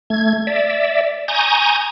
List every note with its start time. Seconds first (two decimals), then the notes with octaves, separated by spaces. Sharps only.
0.10 A3 G#6
0.47 D5 E5
1.28 G#5 A#5 C#6 D#6 G6